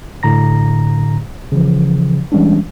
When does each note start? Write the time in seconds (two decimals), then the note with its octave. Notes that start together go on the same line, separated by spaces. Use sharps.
0.23 A2 D3 A#5 A#6
1.52 C#3 E3 F3
2.32 E3 G3 G#3 C#4 D4